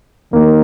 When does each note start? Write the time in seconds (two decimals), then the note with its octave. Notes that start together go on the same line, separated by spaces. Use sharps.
0.33 D#3 A#3